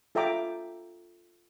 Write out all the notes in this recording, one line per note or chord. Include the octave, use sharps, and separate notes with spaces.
F4 A4 E5 G5 A#5 D6